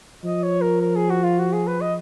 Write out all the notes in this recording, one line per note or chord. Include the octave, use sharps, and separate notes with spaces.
F3 D#5
C#5
A#4
A#4
G#4
F#4
F4
F#4
G#4
B4
D#5